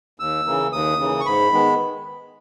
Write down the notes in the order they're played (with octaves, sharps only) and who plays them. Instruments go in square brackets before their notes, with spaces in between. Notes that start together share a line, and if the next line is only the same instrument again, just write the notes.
[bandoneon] D#2 E6
C#3 E3 A#3
D#2 D#6
C#3 E3 A#3
C#6
G#2 B5
D#3 G#3 B3